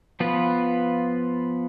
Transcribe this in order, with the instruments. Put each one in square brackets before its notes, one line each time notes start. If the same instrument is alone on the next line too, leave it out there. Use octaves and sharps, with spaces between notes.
[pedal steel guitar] F3 B3 F4 B4